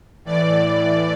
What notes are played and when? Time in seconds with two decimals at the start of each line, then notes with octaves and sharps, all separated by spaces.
0.25 A2 E3 D5